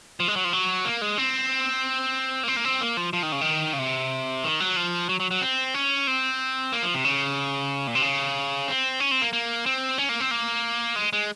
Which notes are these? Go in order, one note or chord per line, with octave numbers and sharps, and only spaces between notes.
F3
G#3
F#3
F3
F#3
A#3
G#3
C4
A#3
C4
A#3
C4
A#3
F3
F3
D#3
C#3
D#3
C#3
C3
D#3
F#3
F3
F#3
F#3
F#3
C4
C#4
C4
A#3
F3
C3
C#3
A#2
C3
C#3
C4
C#4
C4
A#3
A#3
C4
C#4
A#3
C4
A#3
G#3
G#3